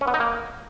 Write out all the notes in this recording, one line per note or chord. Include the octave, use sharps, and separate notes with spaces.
C#4
B3
D#4
A#3